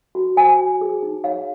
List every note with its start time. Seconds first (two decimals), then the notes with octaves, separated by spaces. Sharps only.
0.15 F#4
0.37 C5 G#5
0.59 F#4
0.81 G#4
1.03 D#4
1.24 C#5 F5